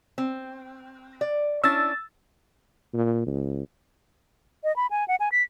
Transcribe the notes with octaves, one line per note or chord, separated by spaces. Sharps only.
C4
D5
C#4 D4 E4 E6 A6
A#2
C#2
D#5
B5
G#5
F#5
G#5
B6